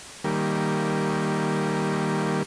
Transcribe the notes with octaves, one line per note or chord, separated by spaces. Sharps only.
D#3 G3 A#3